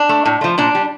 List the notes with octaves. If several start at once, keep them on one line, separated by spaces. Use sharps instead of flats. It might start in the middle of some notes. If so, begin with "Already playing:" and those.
Already playing: D4
A3
A2
F3 A3
A#2 D4
G3